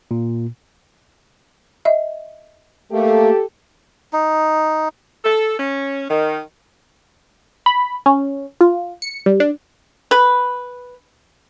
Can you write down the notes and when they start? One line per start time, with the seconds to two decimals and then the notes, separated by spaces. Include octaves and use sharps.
0.11 A#2
1.85 D#5 E5
2.92 A3 A#3 G4 A4
4.13 D#4
5.25 A4
5.59 C#4
6.10 D#3
7.66 B5
8.06 C#4
8.61 F4
9.02 C#7
9.26 G3
9.40 D4
10.11 B4